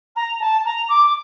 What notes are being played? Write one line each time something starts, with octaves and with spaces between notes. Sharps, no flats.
A#5
A5
A#5
D6